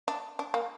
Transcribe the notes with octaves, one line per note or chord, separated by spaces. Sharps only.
D4
D4
A#3